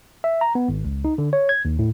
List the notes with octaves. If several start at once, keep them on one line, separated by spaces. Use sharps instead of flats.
E5
A#5
B3
G#1
C#2
D#4
D3
C#5
G#6
D#2
A2